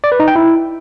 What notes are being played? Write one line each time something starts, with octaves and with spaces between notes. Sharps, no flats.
D5
B4
D#4
G5
E4